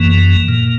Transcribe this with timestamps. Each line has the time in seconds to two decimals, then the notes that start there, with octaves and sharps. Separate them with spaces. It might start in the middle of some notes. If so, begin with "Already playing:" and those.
Already playing: F#2 E3 A#3
0.48 A#2